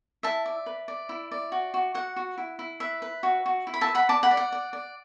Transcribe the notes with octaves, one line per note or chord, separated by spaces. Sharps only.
E4 E5 A5
D5
B4
D5
E4
D5
F#4
F#4
F#4 F#5
F#4
E4
E4
B4 E5
B4
F#4
F#4
E4
B5
E5 A5
B4
F#5 B5
D5 A5 D6
F#5 B5
D5
F#5
D5
D5